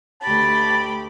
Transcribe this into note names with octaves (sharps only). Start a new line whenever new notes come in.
D2 G4 A5 B5